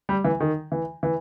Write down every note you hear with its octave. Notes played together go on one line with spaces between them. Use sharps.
G3
E3
D#3
E3
E3